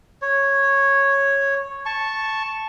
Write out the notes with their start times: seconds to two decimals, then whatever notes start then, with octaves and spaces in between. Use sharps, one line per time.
0.22 C#5
1.86 A5 C#6